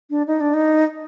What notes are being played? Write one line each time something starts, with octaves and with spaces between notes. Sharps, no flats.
D4
D#4
D4
D#4